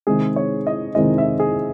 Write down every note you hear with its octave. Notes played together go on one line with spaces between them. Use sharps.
C3 D#3 G#3 C4 G#4
C#5
D#5
C3 D#3 G#3 C4 D#5
E5
G#4